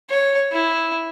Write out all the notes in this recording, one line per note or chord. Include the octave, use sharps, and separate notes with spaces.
C#5
E4